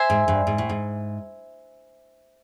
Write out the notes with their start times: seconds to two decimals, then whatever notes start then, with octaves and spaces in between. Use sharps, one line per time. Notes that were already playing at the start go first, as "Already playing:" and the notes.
Already playing: C5 E5 G#5 C6
0.10 G#2
0.28 G2
0.47 G#2
0.58 A2
0.69 G#2